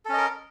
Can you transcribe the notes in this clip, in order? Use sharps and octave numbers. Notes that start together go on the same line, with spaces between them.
C#4 A4 A#4 D#5